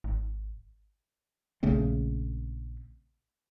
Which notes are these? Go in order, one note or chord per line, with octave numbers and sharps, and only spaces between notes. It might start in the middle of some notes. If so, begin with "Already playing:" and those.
G#1
A#1 C#3 A3 C4